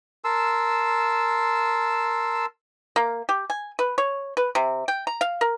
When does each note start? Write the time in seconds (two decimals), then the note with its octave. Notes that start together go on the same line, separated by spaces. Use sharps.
0.25 A#4 A5 C6 E6
2.96 A#3
3.29 G4
3.50 G#5
3.79 B4
3.98 C#5
4.37 B4
4.55 C3
4.88 G5
5.07 A#5
5.21 F5
5.41 A#4